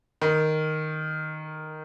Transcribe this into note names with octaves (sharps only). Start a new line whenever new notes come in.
D#3